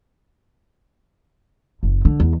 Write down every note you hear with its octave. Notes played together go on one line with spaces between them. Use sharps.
F#1
D3
E2